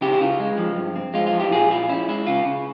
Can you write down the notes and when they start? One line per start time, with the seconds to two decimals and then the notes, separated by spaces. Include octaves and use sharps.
0.01 C#3 E4 G4
0.12 E4
0.21 C#3 F4
0.40 G#3
0.58 F3
0.76 G2
0.96 C4
1.14 G#3 F4
1.27 F4
1.32 F3
1.39 E4 G4
1.51 A#2 F4 G#4
1.71 E4 F4
1.89 C#4 E4
2.08 G#3 E4
2.27 C#3 F4
2.46 C#3